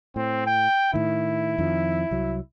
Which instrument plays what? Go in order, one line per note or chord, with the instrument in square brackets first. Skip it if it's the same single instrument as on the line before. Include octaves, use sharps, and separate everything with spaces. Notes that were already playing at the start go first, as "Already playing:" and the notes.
[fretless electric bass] A2 [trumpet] C4
[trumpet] G5
[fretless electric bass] A2 D#3 [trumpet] E4
[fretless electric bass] F2 D#3 F3
C2 F#3